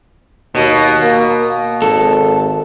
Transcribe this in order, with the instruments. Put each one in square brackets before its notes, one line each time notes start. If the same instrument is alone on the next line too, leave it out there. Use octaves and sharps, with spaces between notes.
[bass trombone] D#2 [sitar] B2
[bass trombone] A#3
[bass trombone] G#1 [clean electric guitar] A4